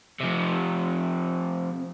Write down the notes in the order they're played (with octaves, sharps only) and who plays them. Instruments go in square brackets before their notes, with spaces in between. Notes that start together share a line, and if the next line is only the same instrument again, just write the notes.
[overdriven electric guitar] C3 F3